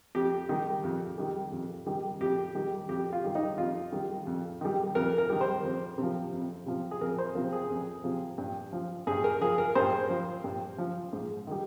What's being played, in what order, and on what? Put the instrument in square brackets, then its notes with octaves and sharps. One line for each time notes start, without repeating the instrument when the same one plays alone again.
[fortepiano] F2 G4
D#3 G3
F2
D#3 G3
F2
D#3 G3
F2 G4
D#3 G3
F2 G4
F4
D#3 G3
D#4
F2 F4
D#3 G3
F2
D#3 G3
F2 A#4
A#4
D#3 G3
C5
F2
C3 F3
F2
C3 F3
G#4
F2 A#4
C5
C3 F3 A#4
G#4
F2
C3 F3
G2
F3
G2 G#4
A#4
F3 G#4
A#4
G2 C5
F3
G2
F3
G#2
D#3 G3